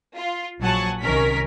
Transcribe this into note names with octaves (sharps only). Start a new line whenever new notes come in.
F4
A#1 F#3 F#5 G#5 A5 C#6
C2 D#3 C#4 A#4 B6